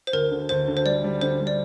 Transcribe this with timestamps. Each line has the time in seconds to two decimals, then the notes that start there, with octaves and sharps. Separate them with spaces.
0.07 C5
0.13 D2 A#4
0.31 D3
0.49 D2 C5
0.68 D3
0.77 C5
0.85 G3 D5
1.04 G3
1.21 D3 C5
1.40 G3
1.47 D5